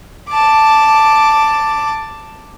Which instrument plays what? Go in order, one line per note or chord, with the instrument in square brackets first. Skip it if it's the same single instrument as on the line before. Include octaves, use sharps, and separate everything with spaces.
[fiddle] A5 D6